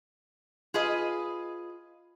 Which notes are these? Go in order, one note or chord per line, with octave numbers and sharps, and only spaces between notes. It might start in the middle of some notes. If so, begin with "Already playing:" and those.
F4 G#4 B4 D#5